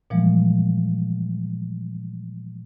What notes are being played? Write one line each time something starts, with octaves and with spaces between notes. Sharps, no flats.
A#2 E3 F3 G3 G#3 A#3